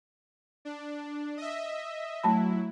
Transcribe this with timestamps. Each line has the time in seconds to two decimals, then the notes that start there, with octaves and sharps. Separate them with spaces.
0.65 D4
1.37 D#5 E5
2.24 F#3 A3 E4 A5 B5